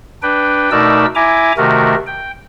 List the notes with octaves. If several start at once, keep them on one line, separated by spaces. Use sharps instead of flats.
D4 B4 G5
B2 A3 D#4 A#4 D5 E6
E4 E5 G#5 A#5 D6
C3 D#3 A3 F#4 A#4
G5